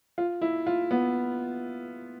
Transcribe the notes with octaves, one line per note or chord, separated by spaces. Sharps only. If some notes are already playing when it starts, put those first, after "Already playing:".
F4
E4
F4
B3